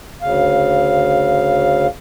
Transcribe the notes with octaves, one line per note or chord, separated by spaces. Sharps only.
D2 C#3 F5